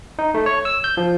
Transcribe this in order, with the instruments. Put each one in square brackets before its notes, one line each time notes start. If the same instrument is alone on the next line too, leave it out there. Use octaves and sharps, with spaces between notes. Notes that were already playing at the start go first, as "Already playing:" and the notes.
[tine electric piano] D#4
A3
C#5
E6
G6
F3